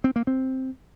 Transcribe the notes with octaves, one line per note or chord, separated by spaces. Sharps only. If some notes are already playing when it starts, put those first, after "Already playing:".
C4
A#3
C4